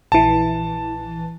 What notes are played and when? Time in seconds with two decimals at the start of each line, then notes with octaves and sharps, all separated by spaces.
0.12 A#1 E3 A5